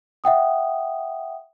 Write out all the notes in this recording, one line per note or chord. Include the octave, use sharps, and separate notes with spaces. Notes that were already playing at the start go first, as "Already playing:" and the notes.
E5 F#5 G5 D#6